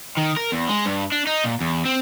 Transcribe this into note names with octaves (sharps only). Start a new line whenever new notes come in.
D#3
A#4
E2
G#3
G2
D4
D#4
A#2
E2
C4